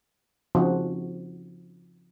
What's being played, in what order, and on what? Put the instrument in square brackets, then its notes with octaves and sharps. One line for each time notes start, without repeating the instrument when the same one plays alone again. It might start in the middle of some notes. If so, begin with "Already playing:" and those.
[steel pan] C#3 F3 C4 D#4 F#4